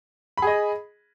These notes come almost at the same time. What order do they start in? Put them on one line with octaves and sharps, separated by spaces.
B5 G#4 D#5